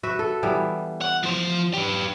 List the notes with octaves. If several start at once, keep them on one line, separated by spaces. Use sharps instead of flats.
F#4 B4 E5
A4
E3 G3 B3
F#5
F3 C5
G4 B4